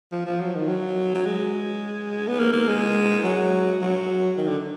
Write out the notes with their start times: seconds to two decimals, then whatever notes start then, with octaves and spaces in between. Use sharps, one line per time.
0.12 F3
0.26 F3
0.40 F#3
0.55 D#3
0.69 F#3
1.15 F#3
1.26 G#3
2.28 B3
2.39 A#3
2.53 A#3
2.68 G#3
3.24 F#3
3.81 F#3
4.37 D#3
4.47 D3